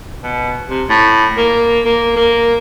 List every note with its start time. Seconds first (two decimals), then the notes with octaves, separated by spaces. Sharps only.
0.22 B2
0.68 C3
0.90 A2
1.37 A#3
1.85 A#3
2.16 A#3